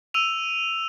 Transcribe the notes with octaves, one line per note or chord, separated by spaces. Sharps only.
E6 D#7 F7